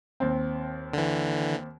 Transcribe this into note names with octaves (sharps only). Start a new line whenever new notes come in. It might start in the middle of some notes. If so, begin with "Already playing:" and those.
D#2 C4
D3 E3